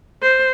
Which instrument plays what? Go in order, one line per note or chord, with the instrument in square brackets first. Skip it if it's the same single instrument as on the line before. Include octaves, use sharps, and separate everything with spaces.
[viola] C5